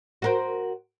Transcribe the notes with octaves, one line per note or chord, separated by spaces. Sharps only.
F#4 A#4 C5